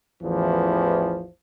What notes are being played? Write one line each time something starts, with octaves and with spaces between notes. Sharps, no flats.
A1 E2 E3 F3